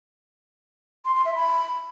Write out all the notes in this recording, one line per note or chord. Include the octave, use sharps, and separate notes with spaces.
C6
C6
E5
B5